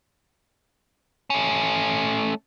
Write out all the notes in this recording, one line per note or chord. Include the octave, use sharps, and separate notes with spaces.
A3 C#4